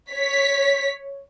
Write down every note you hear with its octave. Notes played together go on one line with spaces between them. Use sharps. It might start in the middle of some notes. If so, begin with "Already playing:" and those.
C#5 B6